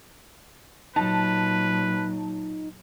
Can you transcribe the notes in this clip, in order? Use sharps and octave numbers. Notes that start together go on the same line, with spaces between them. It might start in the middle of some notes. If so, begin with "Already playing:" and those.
A#2 F#3 D#4 F4 B4 A5